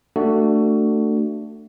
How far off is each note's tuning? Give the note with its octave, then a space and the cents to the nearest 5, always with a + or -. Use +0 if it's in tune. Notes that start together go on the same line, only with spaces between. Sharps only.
A3 +20 D4 +15 F#4 +15